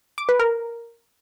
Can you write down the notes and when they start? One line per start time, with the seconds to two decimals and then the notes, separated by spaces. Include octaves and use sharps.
0.18 D6
0.29 B4
0.40 A#4